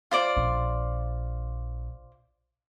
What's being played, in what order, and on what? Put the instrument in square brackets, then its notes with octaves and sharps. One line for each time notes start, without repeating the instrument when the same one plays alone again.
[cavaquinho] F4 C5 D5
[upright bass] A#1